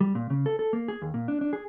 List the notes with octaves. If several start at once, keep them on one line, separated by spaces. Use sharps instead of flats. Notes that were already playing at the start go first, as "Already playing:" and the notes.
G3
A#2
C#3
A4
A4
A#3
G#4
D#2
A#2
D4
D4
G#4